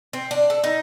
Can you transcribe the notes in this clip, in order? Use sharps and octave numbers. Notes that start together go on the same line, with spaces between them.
C4
D4
A4
D#4